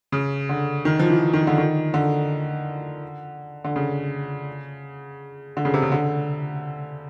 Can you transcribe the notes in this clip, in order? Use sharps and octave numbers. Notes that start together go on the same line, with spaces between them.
C#3
D3
D#3
F3
E3
D#3
D3
D#3
D3
D3
C#3
D3
C#3
C3
C#3
D3